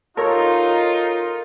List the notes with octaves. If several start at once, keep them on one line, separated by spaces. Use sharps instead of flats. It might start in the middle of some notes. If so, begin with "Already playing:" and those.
D#4 F4 A4 A#4 C#5